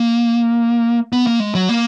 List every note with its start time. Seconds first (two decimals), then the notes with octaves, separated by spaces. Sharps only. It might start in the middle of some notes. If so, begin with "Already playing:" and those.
Already playing: A#3
1.13 B3
1.27 A#3
1.40 G#3
1.55 F#3
1.69 A#3